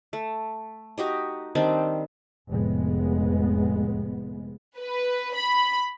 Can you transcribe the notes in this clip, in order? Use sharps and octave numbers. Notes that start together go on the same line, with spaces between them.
A3
D#4 F#4 G4 D#5
D#3 G3 C4 D4
F1 A2 G#3 B3
B4
B5